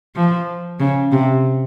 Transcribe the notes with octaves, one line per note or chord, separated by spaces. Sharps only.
F3
C#3
C3